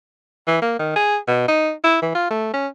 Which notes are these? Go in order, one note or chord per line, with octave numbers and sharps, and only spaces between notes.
E3
A#3
D#3
G#4
B2
D#4
E4
E3
F4
A3
C#4